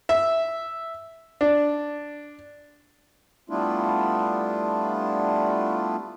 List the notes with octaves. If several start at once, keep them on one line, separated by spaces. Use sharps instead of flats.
E5
D4
G3 A3 B3 D4 E4 F4